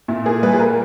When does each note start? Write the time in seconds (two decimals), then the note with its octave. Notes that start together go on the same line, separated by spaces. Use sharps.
0.08 A#2 E4
0.25 A#3 G#4
0.43 G3 B4
0.53 G#4
0.59 A#3 A#4